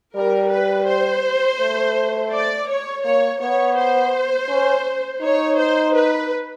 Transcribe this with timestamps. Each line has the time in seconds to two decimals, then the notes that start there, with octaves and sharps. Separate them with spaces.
0.17 G3 A#4
0.52 B4
0.88 C5
1.60 A3
2.32 D5
2.69 C#5
3.05 A#3 C#5
3.41 B3 C#5
3.77 C5
4.49 C#4
5.22 D#4 C#5
5.58 C5
5.94 B4